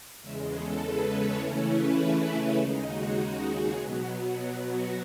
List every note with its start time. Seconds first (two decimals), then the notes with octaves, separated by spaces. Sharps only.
0.21 E2 C#3 G#3 E5
0.50 A4
0.79 B4
1.08 C#5
1.38 C#3 E3 A3 C#4 E4 E5
1.67 B4
2.56 D#2 C#3 G#3 D#4
2.85 F#4
3.43 G#4
3.73 B2 F#3 B3
4.61 F#4